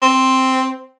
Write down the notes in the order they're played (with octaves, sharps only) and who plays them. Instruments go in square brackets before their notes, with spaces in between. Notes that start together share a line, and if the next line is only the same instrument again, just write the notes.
[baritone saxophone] C4